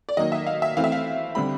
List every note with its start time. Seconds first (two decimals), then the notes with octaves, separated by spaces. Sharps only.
0.09 D5
0.17 D#3 F#3 A#3 D#5
0.32 E5
0.47 F5
0.62 E5
0.77 E3 A3 C4 F5
0.84 E5
0.92 F5
1.35 D3 G3 C4 B5